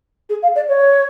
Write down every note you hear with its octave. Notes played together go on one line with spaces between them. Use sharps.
G#4
F5
D5
C#5